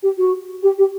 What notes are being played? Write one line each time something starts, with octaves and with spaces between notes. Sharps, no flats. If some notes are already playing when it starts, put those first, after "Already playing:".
G4
F#4
G4
G4